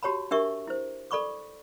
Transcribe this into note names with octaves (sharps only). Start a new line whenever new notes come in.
F#4 G4 C#5 A5 B5
D4 G4 A#4 E5 C#6
E4 C5
A4 D5 B5 C#6 D6